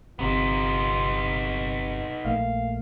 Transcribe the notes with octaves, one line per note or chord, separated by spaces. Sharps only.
G1 C3 B3 C4 D#4 F4
A#1 A3 A#3 F5